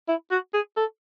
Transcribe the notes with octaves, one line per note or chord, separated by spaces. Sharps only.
E4
F#4
G#4
A4